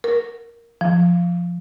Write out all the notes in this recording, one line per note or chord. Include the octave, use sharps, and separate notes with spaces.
A#4
F3